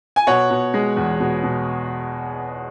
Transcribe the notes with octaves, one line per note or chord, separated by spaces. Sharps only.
G#5
B2 C#5 F#5
B2
G#3
E2
B2
B2